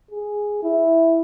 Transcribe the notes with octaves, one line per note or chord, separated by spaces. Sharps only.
G#4
E4